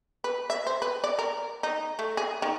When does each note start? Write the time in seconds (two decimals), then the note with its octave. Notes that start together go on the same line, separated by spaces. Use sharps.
0.24 B4
0.50 E5
0.67 C5
0.82 B4
1.04 D5
1.19 A#4
1.63 D#4
1.99 A3
2.17 G#4
2.42 D#3